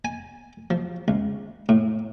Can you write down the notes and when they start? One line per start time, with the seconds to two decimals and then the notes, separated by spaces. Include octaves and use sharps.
0.05 G#5
0.70 F3
1.08 C#2
1.69 A2